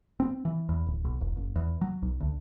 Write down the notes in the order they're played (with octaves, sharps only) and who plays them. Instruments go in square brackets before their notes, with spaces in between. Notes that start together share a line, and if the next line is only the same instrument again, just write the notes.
[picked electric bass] C4
E3
E2
D1
B1
E1
F#1
E2
F#3
B1
D2